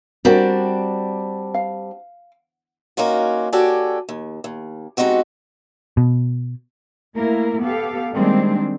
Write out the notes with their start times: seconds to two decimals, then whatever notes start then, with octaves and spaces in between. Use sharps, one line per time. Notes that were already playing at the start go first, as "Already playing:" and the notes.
0.25 G3 C4 D4 F#4 A#4
1.54 F5
2.97 A#3 C#4 D#4 F4 F#4
3.53 F#4 G4 A4 C#5 D5 G#5
4.09 D#2
4.44 D#2
4.97 G#3 B3 C4 D#4 F#4 G4
5.97 B2
7.16 A3 A#3 E4 A#4
7.60 B3 G4 A4 F5
8.13 D#3 G3 G#3 A#3 C4 D4